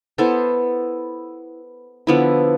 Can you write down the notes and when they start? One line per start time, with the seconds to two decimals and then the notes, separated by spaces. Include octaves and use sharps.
0.18 B3 E4 A4 C5
2.07 D3 F3 B3 E4